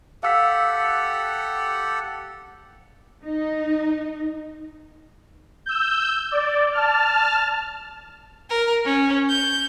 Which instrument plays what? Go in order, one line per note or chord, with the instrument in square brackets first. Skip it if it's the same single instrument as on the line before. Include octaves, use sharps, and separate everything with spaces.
[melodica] G4 A4 F#5 [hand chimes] F5 E6 B6
[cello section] D#4
[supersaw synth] E6 G6
D5
A5 F6
[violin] A#4
C#4
G6